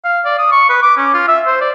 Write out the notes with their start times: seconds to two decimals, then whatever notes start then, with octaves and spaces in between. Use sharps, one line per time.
0.04 F5
0.25 D5
0.38 D#6
0.52 C#6
0.69 B4
0.82 D6
0.97 C#4
1.13 F4
1.28 E5
1.47 C5
1.61 D5